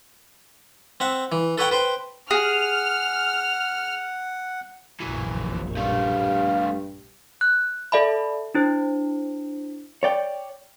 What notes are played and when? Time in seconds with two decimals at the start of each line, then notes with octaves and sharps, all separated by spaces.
1.00 C4 E5 F#5
1.32 E3
1.58 A4 B4 C#5 F#5 G5
1.71 B4 C5 G5
2.31 G#4 F#5 F6
5.00 F1 A#1 F#2 E3 F#3
5.77 G2 G3 A3 F5
7.41 F#6
7.92 A4 D5 E5 A5 B5
8.55 D4 E4 C5
10.03 C#5 D5 G5